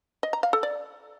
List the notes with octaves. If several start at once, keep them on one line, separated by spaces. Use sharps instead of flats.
D#5
A#5
F5
A4
D5